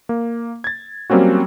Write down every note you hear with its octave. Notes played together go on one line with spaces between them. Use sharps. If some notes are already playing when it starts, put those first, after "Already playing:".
A#3
G#6 A6
F#3 G3 A#3 C4 C#4 F#4